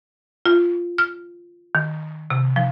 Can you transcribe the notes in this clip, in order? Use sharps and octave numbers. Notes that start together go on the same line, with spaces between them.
F4
F6
D#3
C3
F3